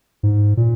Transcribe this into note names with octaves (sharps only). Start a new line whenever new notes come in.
G#2
A#2